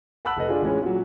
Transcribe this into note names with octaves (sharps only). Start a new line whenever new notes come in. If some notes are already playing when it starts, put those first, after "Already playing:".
F#5 A5 B5 E6 F#6 F#7
F1 A4 B4 D#5
D4 F4 G#4
A1 E3 G#3 C#4
A#2 F#3